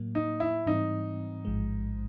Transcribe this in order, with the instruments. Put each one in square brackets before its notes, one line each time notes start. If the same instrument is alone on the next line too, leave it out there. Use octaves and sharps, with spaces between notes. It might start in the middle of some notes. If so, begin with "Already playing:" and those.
Already playing: [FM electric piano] A2 F#3 A#3
[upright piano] D#4
E4
[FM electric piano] G#2 E3 G3 C4 [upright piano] D#4
[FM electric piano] A1 G#2 F3 G#3